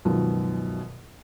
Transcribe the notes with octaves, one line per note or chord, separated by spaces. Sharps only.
C#2 F#2 B2 D#3 F3 F#3